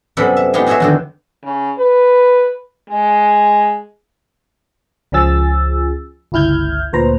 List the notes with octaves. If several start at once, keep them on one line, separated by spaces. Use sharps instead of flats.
F#2 C3 G3 B3 A4 B5
E5
G#3 B3 D#4 F4 G4
F#4 G#4 A4 C#5 D#5 E5
F2 D3 D#3
C#3
B4
G#3
C#2 C#3 F3 G#4 E6 A6
G1 C#2 E4 F6 G6 G#6
D2 A#2 B4 C5 A#5